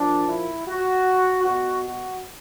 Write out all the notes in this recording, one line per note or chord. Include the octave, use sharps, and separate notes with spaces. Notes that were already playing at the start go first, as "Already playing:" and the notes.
Already playing: A#2 F3 D4
E4
F#4
B2 F#4
F#4